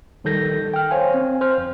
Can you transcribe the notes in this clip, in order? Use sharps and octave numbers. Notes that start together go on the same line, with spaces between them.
A#1 D#3 G3 A4 G6 A#6
G5 F6
C5 C#5 F5 G#5
C4
C5 F6
F2